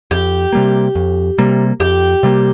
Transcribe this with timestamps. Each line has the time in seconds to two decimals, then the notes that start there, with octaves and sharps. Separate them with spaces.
0.11 F2 G4
0.53 C3 G3 A#3
0.95 F2
1.38 C3 G3 A#3
1.80 F2 G4
2.23 C3 G3 A#3